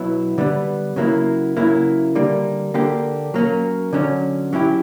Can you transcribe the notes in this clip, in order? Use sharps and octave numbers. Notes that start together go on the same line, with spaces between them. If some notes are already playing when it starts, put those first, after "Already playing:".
Already playing: B2 F#3 B3 E4
D3 G3 B3
C#3 F#3 A#3 E4
C#3 F#3 A#3 E4
D3 G3 A#3
D3 A#3 D4 G4
F#3 A#3 C#4
D3 F#3 C#4
F#3 C#4 E4 G4